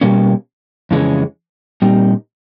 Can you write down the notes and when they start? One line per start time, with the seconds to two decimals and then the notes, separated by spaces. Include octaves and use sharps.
0.01 B2 G3 A#3 C#4
0.91 F2 C#3 E3 G#3 C#4
1.82 A#2 G3 C4 D#4